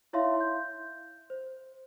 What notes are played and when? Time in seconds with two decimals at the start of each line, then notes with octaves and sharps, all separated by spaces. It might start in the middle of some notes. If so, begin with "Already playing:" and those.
0.13 D#4 E4 C#5 E5 F5 C6
0.40 G6
1.30 C5